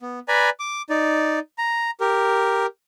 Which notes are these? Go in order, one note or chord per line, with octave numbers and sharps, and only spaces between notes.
B3
B4 D5 G#5 A#5 B5
D6
D#4 D5
A#5
G4 A#4